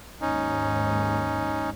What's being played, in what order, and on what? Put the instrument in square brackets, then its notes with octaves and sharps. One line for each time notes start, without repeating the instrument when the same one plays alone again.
[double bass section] D#2 G#2 [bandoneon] C#4 D#4